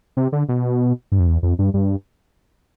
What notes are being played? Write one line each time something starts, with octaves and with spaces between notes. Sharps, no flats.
C3
D3
B2
G2
F2
E2
F2
G2
G2